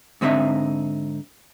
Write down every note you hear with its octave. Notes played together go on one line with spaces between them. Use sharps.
G#2 D3 C4 D#4 E5